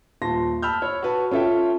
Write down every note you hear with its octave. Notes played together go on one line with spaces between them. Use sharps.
D#1 A5 C6 A#6
A5 B5 E6 F6 G6
C#5
F#4 B4 A5
C#4 F4 A4 E5 G5